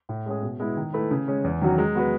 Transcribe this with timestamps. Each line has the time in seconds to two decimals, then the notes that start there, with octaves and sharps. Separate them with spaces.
0.09 A2
0.26 G#3 C#4 G#4
0.43 B2
0.60 G#3 B3 E4
0.77 D#3
0.93 A3 E4 B4
1.11 C#3
1.28 G#3 C#4
1.44 E2
1.61 D#3 F#3 C#4 F#4
1.78 G#3
1.95 B3 F#4 B4